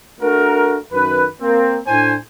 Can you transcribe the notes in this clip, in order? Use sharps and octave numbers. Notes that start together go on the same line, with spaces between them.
A3 D4 F#4 A#4
F#2 D#3 B4
A#3 C4
A2 D4 C5 G#5